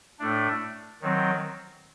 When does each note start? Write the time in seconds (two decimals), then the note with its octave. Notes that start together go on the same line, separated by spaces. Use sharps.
0.19 A2 A3 D4
1.02 D#3 F#3 C4